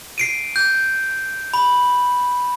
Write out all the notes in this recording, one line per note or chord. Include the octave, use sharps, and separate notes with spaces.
C7 D7 D#7
G6
B5